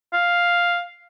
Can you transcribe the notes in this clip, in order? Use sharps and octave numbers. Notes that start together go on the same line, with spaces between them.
F5